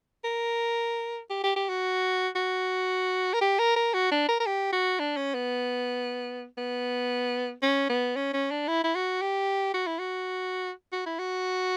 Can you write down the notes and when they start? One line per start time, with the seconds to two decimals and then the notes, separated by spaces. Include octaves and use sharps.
0.24 A#4
1.30 G4
1.44 G4
1.56 G4
1.69 F#4
2.35 F#4
3.34 A#4
3.41 G4
3.59 A#4
3.76 A#4
3.94 F#4
4.12 D4
4.29 A#4
4.40 A#4
4.46 G4
4.73 F#4
4.99 D4
5.17 C#4
5.34 B3
6.57 B3
7.63 C#4
7.89 B3
8.16 C#4
8.33 C#4
8.51 D4
8.68 E4
8.84 E4
8.95 F#4
9.22 G4
9.74 F#4
9.87 E4
9.99 F#4
10.92 F#4
11.06 E4
11.19 F#4